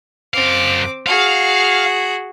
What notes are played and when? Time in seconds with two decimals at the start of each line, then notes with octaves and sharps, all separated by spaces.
0.34 F#2 C4 F5 D6
1.06 F#4 G#4 F5